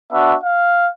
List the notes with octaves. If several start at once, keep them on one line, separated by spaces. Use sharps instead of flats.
B3 D4 F#4 E5
F5